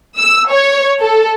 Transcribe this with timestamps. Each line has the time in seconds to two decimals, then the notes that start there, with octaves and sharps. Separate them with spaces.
0.18 E6
0.51 C#5
1.01 A4